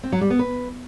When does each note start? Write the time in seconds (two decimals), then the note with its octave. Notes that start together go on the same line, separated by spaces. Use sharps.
0.03 C4
0.12 F#3
0.21 G3
0.30 B3
0.39 B4